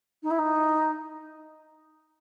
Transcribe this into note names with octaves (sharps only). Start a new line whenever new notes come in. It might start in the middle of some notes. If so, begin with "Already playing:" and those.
D#4
E4
D#4